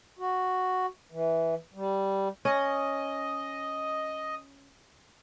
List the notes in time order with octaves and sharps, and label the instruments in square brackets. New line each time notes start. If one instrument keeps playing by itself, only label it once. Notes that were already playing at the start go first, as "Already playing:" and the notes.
[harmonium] F#4
E3
G3
[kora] C#4 [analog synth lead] D#5